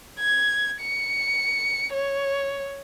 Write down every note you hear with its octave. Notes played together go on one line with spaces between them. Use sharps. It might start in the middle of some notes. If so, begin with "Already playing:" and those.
G#6
C#7
C#5